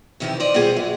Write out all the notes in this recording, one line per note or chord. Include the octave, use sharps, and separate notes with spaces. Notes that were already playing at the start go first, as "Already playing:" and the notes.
F2 C3 D#3 E3 D#4 E4
C5 D5 D#5
B2 G3 F4 G4 G#4 G#5
F#2